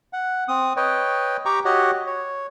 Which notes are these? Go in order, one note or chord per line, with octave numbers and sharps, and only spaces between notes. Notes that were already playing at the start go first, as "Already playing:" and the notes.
F#5
C4 D#6
B4 C#5 D#5 G5
G4 G5 A#5 C#6 D6
F#4 G4 C#5 D#5 F#5
C#5